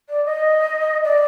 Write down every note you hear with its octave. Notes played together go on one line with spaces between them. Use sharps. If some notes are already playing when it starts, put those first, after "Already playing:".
D5
D#5
D5